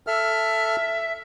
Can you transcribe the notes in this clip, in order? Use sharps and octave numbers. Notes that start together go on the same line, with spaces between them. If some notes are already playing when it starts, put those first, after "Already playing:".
A4 E5 F6